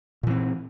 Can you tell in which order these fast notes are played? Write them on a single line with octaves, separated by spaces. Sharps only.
A#2 E3 C4